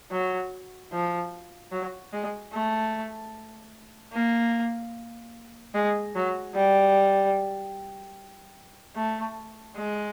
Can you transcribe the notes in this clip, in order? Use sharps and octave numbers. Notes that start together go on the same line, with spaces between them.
F#3
F3
F#3
G#3
A3
A#3
G#3
F#3
G3
A3
G#3